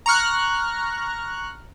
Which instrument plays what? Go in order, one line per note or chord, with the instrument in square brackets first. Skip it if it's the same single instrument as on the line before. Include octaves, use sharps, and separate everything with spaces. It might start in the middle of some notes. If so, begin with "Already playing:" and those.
[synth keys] A#5 C#6 F6 F#6